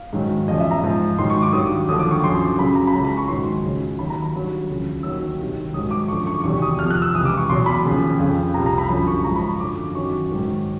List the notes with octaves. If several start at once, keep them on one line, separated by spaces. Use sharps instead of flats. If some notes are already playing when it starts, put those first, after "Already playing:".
Already playing: F5
G#2 D#3 F#3
E2 C#3 F3 D#5
E5
A#5
G#2 F3
G#2 D#3 F#3 C6
C#6
D6
G2 D#3 F#3 D#6
D#2 D3 F3 D#6
D6
C#6
F#2 D3 F3 C6
C6
F#2 C#3 F#3 B5
A#5
B5
C#2 C#3 F#3 A#5
B5
C#6
G#2 D#3 F#3 C6
C#2 C#3 F#3
D#2 D#3 F#3 B5
A#5
B5
G2 D#3 F#3
D2 C#3 F3
D#2 D#3 F#3 E6
C2 C3 D#3
G#2 D#3 F#3 D#6
D6
F#2 D3 F3 C#6
C#6
E2 C3 D#3 F#3 C#6
D#6
F2 C3 F3 F6
F#6
E6
C#2 C3 E3 D#6
D6
C#6
E2 B2 F#3 C6
B5
D#2 C#3 F3
F2 C#3 F3
C2 C3 F3 A#5
A#5
B5
F#2 D3 F3 B5
C#6
G#2 F3 A#5
B5
C#6
F#2 D3 F3 D6
F#2 D#3 F#3 C#6
G#2 D#3 F#3